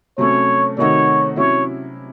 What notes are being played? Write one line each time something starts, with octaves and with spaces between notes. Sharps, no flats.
C3 F#3 A3 C#4 C#5
C3 D#3 A3 D#4 F#4 C#5
C3 F#3 C#4 E4 C#5